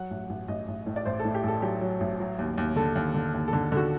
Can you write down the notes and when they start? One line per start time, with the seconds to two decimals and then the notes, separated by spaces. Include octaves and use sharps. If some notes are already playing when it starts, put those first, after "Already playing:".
Already playing: F#3 F#5
0.10 A1
0.29 A1
0.48 A1 D#5
0.68 A1
0.86 A2
0.96 D5
1.05 A1 C5
1.20 A4
1.25 A2
1.35 G4
1.43 A1 A4
1.62 F#3 G4
1.81 F#3
2.00 A1
2.20 F#3
2.39 D#2
2.58 D#2
2.76 D3 A4
2.96 D#2
3.14 D3
3.34 D#2
3.48 A4
3.53 D3
3.72 D3 F#4